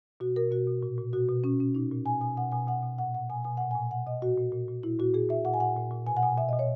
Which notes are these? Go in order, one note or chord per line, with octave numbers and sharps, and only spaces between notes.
B2 F#4
B2 A#4
B2 F#4
B2
A#2
A#2
B2 F#4
B2
B2 C#4
B2 C#4
A#2 D#4
A#2
B2 G#5
B2 G#5
B2 F#5
B2 G#5
B2 F#5
B2
A#2 F#5
A#2 F#5
B2 G#5
B2 G#5
A#2 F#5
A#2 G#5
B2 F#5
B2 D#5
A#2 F#4
A#2
A#2
A#2
A#2 E4
A#2 F#4
A#2 G#4
A#2 E5
A#2 F#5
G#5
A#2 F#5
A#2
A#2
B2 G#5
F#5
B2 G#5
B2 E5
B2 D#5
C#5